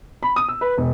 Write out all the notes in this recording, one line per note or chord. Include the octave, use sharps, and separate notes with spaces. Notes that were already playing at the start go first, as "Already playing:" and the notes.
B5
D#6
E6
B4
E1